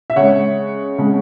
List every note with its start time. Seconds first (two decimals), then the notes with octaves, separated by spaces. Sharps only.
0.10 E5
0.16 C#3 G#3 C#5 F#5
0.98 C#3 G#3